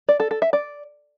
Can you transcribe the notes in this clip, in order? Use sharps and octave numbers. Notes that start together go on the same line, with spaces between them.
D5
A4
A4
E5
D5